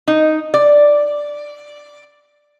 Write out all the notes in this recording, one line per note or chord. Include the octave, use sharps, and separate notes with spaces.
D#4
D5